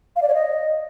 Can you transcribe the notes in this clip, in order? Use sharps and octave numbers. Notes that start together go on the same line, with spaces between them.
F5
D5
C#5
D#5